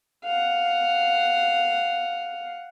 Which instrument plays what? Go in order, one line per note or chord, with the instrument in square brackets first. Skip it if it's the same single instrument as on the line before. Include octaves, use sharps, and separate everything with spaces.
[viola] F5 F#5